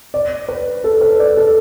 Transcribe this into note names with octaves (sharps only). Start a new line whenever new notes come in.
D5
B4
A4
B4
D5
A4